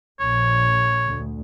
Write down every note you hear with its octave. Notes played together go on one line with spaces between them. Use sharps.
A#1 C#5
D2